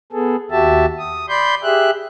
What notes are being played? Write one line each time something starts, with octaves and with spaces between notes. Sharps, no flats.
B3 G#4 A4
D#2 F#4 G4 E5 A5
D#6
D5 B5 C6 G6
G4 G#4 E5 F#6